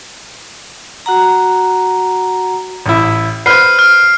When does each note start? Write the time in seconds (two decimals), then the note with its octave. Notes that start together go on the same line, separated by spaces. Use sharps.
1.06 F#4 F#5 A#5
2.86 A1 E4
3.46 B4 C5 F6 C7
3.79 F6